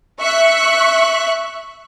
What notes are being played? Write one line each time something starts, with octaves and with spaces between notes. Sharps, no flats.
E5 C#6 F#6